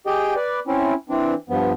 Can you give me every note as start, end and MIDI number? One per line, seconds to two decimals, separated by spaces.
0.07 0.34 67
0.07 0.34 68
0.07 0.34 75
0.07 0.34 79
0.36 0.60 71
0.36 0.60 74
0.67 0.93 60
0.67 0.93 61
0.67 0.93 64
1.09 1.34 52
1.09 1.34 60
1.09 1.34 62
1.49 1.72 43
1.49 1.72 53
1.49 1.72 59